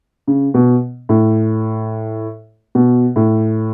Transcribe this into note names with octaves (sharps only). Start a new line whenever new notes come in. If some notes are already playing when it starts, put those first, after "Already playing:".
C#3
B2
A2
B2
A2